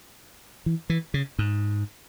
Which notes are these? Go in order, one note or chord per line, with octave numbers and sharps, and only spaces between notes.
E3
E3
C#3
G#2